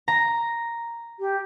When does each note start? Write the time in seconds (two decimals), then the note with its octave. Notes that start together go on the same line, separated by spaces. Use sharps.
0.08 A#5
1.19 G4